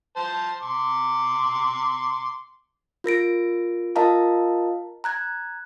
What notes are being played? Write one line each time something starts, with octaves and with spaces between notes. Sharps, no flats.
C5 A5
C6 D6
F4 A#4 A#6 D7
F4 A#4 D#5 F5 A5 A#5
A#5 F#6 G#6